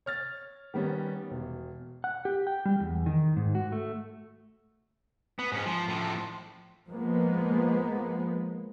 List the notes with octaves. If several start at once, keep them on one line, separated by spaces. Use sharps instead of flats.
C#5 F6 A6
D#3 G3 B3 C#4
E1
F#5
G4
G5
G3
E2
D#3
G#2
F#4
A3
B3
G#2 C#4
F3
A2 F3
F3 G#3 A#3 B3